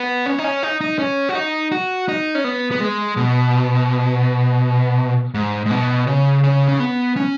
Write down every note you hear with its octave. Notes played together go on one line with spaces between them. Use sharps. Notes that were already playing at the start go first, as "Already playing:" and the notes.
Already playing: B3
C#4
D#4
C#4
D#4
D#4
C#4
F#4
D#4
F#4
D#4
C#4
B3
B3
G#3
B2
G#2
G#2
B2
C#3
C#3
C#4
B3
C#4